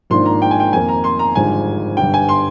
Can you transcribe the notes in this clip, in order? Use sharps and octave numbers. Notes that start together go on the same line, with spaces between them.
G#1 G#2 F3 A#3 D4 C6
A#5
G5
G#5
G5
F2 D#3 A#3 G#5
A#5
C6
A#5
G#1 G2 D3 F3 G#3 G#5
G1 G2 D3 G5
G#5
C6